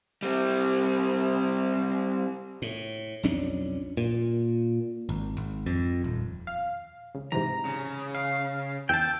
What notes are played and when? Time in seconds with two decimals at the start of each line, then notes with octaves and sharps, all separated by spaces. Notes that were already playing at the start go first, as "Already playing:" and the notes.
0.23 G3 C4
2.62 A2
3.23 B1 F2 C#4 D4
3.97 A#2
5.09 G#1
5.37 G#1
5.66 F2
6.04 D#1
6.47 F5
7.14 C#2
7.32 G#2 C3 E3 A#5
7.65 C#3
8.15 F5
8.89 E2 G5 A5 E6